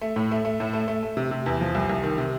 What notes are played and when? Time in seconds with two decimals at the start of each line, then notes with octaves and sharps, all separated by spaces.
0.01 A3
0.16 A2
0.31 A3
0.45 A3
0.60 A2
0.74 A3
0.88 A3
1.03 A3
1.17 C3
1.31 C3
1.46 E2
1.61 F3
1.75 C2
1.89 C2
2.03 D#3
2.18 C3